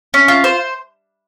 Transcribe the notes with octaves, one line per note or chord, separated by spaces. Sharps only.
C#4
F4
C5